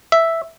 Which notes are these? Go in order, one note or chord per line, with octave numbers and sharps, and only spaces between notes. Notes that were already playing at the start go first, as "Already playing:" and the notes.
E5